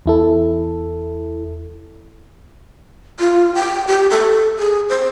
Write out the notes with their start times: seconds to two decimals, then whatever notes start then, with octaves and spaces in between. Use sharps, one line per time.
0.06 E2 E4 A4
3.20 F4
3.55 G5
3.88 G4
4.11 A4
4.59 G#4
4.89 C5